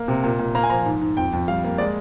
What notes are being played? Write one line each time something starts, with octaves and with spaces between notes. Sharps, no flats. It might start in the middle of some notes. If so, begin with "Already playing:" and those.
Already playing: A#3
C3
A#2
A#2
A#3 A#5
G#5
F3 A#5
G#2
G#2
F2 G5
F2
G3 F5
A#3
G#3 D5